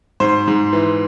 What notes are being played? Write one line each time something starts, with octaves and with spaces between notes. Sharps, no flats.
G#2 C5
G#2
E3